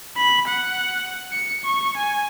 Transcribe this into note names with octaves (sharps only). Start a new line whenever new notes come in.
B5
F#5
C#7
C#6
G#5